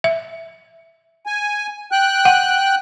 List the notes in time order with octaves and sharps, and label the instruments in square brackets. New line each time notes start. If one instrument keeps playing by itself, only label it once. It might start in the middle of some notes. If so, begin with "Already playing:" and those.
[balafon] E5
[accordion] G#5
G5 F#6
[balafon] F#5